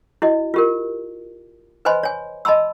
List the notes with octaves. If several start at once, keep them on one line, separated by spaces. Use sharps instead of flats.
E4 F#4 D#5
F4 G4 A#4
B4 C5 D#5 G#5 B5 C6
C#5 G#5
D#5 A5 B5 C6 E6